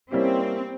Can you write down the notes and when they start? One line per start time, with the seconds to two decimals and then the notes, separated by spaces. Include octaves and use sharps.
0.11 G3 A#3 C4 C#4 E4 G4